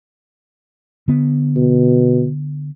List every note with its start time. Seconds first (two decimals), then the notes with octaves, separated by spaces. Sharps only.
1.08 D3 B3
1.56 B2